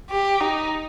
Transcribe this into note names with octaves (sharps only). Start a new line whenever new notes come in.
G4
D#4